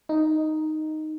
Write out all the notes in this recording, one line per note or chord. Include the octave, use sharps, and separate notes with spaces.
D#4